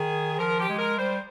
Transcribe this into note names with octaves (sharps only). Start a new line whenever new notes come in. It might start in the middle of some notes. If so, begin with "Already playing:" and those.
Already playing: D#3 G#4
F3 A#4
G4
G#3
A#4
G3 C5